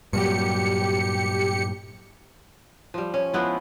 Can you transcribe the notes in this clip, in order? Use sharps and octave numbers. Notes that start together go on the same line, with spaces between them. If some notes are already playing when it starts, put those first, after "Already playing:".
G2 A#2 F#3 G4 C#7
F3 G3
C#4
F3 G#3 B3 E4